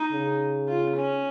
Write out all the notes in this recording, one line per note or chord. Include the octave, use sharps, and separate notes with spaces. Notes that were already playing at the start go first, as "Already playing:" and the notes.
Already playing: D#4
C#3
F4
C#4